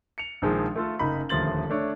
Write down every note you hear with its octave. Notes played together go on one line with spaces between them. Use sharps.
C#7 F7
A#1 D#3 F3 G#3
A3 F4 A4
F#1 D#4 B5
D#1 D2 F3 C6 A6 F#7
A3 D4 C#5